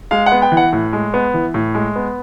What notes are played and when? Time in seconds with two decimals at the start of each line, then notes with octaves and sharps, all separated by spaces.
0.11 G#3 F5
0.26 F#5
0.32 B3
0.42 G5
0.52 E3
0.57 F#5
0.73 A2
0.93 G#3
1.14 B3
1.34 E3
1.54 A2
1.75 G#3
1.96 B3